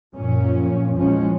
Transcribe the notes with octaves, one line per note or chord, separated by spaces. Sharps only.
F#2 A#2 F3 C#4
A#1 E2 F3 G#3 C#4